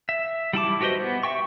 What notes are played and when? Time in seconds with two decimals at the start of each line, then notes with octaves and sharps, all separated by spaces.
0.09 E5
0.53 G3 E4 A5 D6
0.81 F#4 G4 B4 C5 D#5
1.00 B3
1.23 E5 G5 C#6